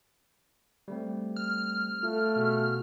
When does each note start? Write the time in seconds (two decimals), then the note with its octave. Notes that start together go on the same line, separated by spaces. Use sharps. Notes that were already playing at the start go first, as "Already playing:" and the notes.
0.88 G3 A3 C4
1.36 F6
2.03 A3 F4
2.36 B2 F#4 G#4